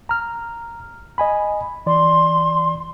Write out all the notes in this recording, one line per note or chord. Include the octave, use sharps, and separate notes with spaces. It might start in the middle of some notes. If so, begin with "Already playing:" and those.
A#5 F6
D#5 G#5 B5
E3 D5 C6